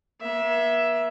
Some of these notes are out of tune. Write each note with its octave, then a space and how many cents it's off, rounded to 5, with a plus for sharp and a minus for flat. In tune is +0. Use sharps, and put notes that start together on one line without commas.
A#3 +45 E5 +0